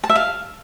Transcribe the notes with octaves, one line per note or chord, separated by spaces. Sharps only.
A5
E5
F5